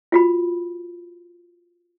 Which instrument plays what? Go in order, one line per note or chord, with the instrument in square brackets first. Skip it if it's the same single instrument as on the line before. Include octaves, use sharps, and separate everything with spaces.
[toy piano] F4 F#4 B5